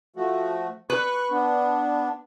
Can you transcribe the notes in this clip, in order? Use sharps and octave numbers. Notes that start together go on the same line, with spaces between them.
F3 A3 F#4
B4 C#6 F#6
B3 D4